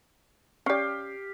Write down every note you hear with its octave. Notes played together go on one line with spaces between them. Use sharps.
C#4 G4 D5 F5